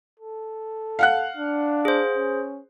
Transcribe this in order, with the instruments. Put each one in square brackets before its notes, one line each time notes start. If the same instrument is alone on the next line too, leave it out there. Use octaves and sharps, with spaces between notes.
[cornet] A4
[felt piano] F5 F#5 F#6
[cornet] D4
[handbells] G#4 C5
[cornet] C#4